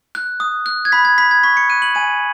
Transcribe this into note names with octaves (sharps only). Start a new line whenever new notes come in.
F#6
D#6
F#6
G#6
B5 B6
G#6
B5 B6
G#6
C#6 B6
C#7
F#6 D#7
F#7
G#5 D#7